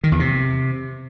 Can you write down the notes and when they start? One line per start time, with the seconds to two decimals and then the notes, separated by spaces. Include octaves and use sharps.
0.04 D#3
0.12 E2
0.20 C3